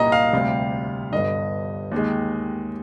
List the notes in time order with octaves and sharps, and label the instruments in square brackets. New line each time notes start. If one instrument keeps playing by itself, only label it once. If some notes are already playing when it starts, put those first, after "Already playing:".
Already playing: [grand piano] C2 A#2 G3 A#3 D#5 A#5
F5
D2 C3 G3
G1 G2 D3 D#5
D#2 D#3 G#3